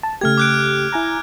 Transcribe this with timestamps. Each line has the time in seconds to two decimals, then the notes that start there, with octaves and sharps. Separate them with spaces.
0.03 A5
0.21 C#3 A3 G4 F6 G#6
0.38 D6 F#6 D7
0.92 E4 G#5 A#5